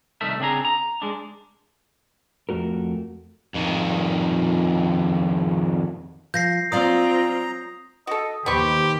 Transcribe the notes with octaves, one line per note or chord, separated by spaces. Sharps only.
C2 D#3 A3 E5
C#3 C4 D4 G#4 A#5
A#5
G#3 D4
F2 A3 F#4 A#4
F2 D#3
F3 G6 A#6 C7
F#3 C4 F4 D5 F5 A#5 D#6
F#4 A4 D#5
D#2 D#3 B3 G4 C5 B5 C#6